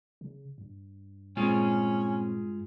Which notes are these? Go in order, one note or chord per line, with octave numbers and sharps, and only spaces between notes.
C#3
G2
A#2 G#3 C4 C#4 F4 G#4